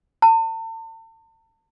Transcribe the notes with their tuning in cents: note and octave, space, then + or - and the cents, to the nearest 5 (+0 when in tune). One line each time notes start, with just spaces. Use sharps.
A5 +40